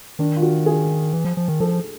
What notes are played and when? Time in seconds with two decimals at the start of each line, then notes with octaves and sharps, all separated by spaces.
0.19 D#3 D4
0.36 F4
0.42 F#4
0.66 G#4
1.13 E3
1.25 F3
1.37 F3
1.48 D#3
1.60 F3 A4